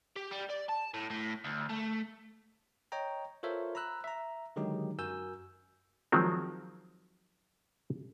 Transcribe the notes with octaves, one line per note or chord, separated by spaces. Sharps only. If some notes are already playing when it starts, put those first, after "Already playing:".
G4
G3
D5
A5
A2
A2
D2
A3
C#5 D#5 G5 A#5
F4 A4 A#4 C5 C#5 E5
A#5 B5 E6 F#6
E5 A#5
D3 D#3 F#3 G#3 D#4 G4
F#2 F#4 A#4 G#5 E6 G6
D#3 F3 F#3 G#3 C4